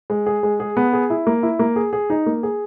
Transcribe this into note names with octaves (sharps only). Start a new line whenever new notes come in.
G#3
G#4
G#3
G#4
B3
G#4
E4
A#3
E4
A#3
G#4
G#4
D#4
A#3
G#4